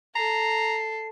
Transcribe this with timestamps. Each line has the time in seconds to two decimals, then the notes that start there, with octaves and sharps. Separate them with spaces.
0.15 A4 A#5 C7